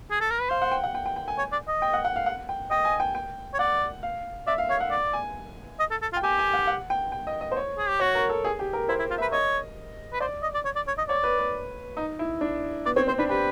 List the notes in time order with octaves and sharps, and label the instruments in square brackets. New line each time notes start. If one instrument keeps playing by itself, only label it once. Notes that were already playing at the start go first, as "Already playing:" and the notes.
[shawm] G#4
A4
A#4
B4
[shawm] C5 [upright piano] F5
[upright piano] F#5
G5
F#5
G5
G5
G5
G#5
[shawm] C#5
D5
D#5
[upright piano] G5
F#5
F#5
F5
F#5
G5
[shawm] D#5 [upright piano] G5
[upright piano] G#5
G5
G5
[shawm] C#5
[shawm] D5 [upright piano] F#5
[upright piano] F5
[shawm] D5 [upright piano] E5
[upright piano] F5
[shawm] C#5 [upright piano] F5
[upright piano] F#5
[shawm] D5
[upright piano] G#5
[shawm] D#5
A4
A4
F4
[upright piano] G5
[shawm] G4 [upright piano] G#5
[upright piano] G#5
F#5
F#5
G5
G5
D#5
D#5
C5
C#5
[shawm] G#4
G4
[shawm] F#4 [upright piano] C#5
[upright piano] A#4
A4
G#4
G4
A#4
[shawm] E4 [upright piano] C5
[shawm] E4
F4
[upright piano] E5
[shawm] B4
[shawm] C#5 [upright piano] D#5
[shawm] B4
[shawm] C5 [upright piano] D5
[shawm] D#5
D5
C#5
D5
C#5
D#5
[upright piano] C#5 [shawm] D5
[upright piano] B4
B4
D#4
E4
D4
[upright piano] B3 [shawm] D5
[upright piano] C4 [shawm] C#5
[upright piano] C4 [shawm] C5
[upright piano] D4 [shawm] B4
[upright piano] G4 [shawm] B4